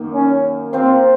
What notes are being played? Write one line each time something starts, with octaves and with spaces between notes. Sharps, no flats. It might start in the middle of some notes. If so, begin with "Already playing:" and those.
Already playing: F#2 D#3 A#3
C#4
A#3 C4 F4 C5 F5